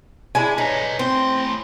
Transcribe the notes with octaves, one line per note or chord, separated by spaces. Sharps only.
G#3 D4 E4 G#5
D#4 B4 C#5
A2 C4 C6